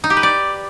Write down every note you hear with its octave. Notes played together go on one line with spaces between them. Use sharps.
D#4
G4
B4
D5